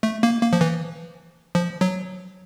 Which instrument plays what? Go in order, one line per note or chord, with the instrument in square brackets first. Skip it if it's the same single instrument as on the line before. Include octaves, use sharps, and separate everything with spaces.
[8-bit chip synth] A3
A#3
A#3
F3
E3
F3
F#3